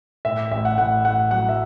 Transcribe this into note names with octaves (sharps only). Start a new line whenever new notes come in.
A2 E5
A1 E5
F#5
A2 F#5
A2 F#5
F#3 F#5
E5